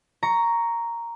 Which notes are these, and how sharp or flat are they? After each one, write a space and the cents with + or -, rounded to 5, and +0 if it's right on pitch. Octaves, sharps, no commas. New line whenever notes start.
A#5 +0 C#6 +10